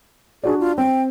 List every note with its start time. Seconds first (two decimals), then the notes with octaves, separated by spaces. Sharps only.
0.44 D4 F#4 G#4 D5
0.60 F4
0.78 C4 G5